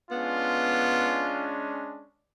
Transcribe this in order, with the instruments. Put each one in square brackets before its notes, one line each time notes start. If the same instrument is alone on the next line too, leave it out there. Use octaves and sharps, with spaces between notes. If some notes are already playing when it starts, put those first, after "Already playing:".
[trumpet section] G#3 C#4 D4 [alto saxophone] B3 [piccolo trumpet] F4